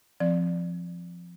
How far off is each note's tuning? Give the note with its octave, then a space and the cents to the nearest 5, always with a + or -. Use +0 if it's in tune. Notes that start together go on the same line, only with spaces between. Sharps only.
F3 +0 C4 +0 D5 +10